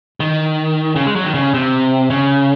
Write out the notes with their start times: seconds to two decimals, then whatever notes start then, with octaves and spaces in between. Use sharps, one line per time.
0.20 D#3
0.96 C#3
1.06 G#3
1.16 F#3
1.25 D#3
1.34 C#3
1.54 C3
2.10 C#3